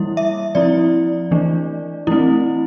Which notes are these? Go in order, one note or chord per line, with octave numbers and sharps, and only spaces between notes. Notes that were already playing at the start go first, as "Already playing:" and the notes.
Already playing: E3 G3 A#3 E4
E5
F3 C4 E4 D5
E3 A3 D4
E3 A3 C4 E4